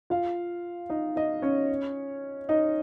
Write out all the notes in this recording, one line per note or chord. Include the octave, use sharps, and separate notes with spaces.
F4 F5
D#4 D#5
D#4 D#5
C#4 C#5
D#4 D#5